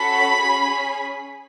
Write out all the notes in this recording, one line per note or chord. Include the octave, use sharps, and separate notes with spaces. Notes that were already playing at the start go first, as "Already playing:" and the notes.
Already playing: C#4 F#4 A4 B5
C#4 G#4